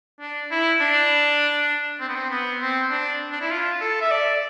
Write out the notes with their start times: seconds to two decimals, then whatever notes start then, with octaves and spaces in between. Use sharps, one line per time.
0.20 D4
0.51 E4
0.81 D4
2.00 C4
2.09 B3
2.16 C4
2.31 B3
2.61 C4
2.91 D4
3.32 D4
3.41 E4
3.51 F4
3.81 A4
4.01 E5
4.11 D5